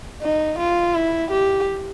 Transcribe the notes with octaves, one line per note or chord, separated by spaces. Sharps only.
D#4
F4
E4
G4